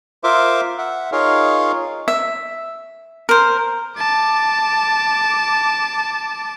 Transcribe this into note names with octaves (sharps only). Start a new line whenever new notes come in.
F4 A#4 C5 E5 D6
E5 F#5
D#4 F4 G#4 A#4 C#5 F5
E5
A#4 C5
A5 D6